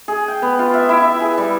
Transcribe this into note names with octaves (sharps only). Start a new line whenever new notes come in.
G#4
G5
B3
F4
E5
E4
E5
G#4
G3